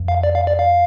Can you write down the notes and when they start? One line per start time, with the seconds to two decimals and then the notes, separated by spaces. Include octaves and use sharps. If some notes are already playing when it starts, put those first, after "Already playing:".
Already playing: F2
0.08 F5
0.24 D5
0.35 F5
0.47 D5
0.59 F5